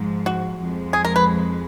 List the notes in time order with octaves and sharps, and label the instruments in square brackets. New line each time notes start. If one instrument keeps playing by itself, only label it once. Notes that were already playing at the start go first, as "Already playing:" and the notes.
Already playing: [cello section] G#2 F3 G#3
[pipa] F#4
[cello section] F2 F3 G#3
[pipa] G#4
A#4
B4